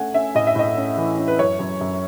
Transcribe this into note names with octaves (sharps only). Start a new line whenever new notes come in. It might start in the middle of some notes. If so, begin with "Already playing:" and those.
Already playing: A3 C#4 F#5 G#5
C#4 E5
A2 D#5
E5
A2 D#5
C#4
E3
C#4
B4
F#2 C#5
F#2
F#2